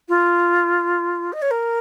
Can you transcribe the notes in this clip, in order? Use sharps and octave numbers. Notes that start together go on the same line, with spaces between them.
F4
D#5
C#5
A#4